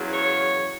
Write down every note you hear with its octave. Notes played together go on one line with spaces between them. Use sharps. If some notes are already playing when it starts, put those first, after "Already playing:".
Already playing: E2 C#3 F#3
C#5